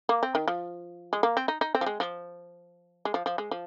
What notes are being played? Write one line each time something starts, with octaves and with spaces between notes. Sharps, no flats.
A#3
C4
D#3
F3
G#3
A#3
C4
D#4
D#4
C4
F3
G#3
F3
G#3
F3
F3
G#3
F3